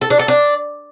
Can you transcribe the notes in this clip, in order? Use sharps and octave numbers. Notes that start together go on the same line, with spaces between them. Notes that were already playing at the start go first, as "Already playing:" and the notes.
A4
D4
A4
D4